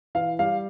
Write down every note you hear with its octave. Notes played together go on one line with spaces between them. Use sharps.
E3 F5
G3 F5